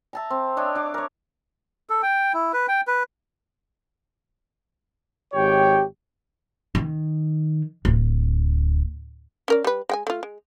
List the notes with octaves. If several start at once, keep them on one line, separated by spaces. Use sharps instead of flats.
E5 A5 A#5
C4
D4 C#5 D#5 E5
D4 D6
A#4 C#5
A4
G5
E4
B4
G5
B4
G#1 G4 C#5 G5
D#3
D1
C#4 A#4 D5
G3 B4
G#3 G5 G#5
A3 F4
G#3